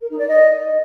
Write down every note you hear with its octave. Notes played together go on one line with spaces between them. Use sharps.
A#4
D#4
D5
D#5